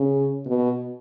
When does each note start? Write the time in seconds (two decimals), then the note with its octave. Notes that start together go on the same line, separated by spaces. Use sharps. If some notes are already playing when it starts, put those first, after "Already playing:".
Already playing: C#3
0.47 B2